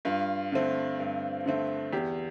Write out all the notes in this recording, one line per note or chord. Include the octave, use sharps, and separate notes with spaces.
G2 F4
D3 A3 C4
G2
D3 A3 C4
E2 G4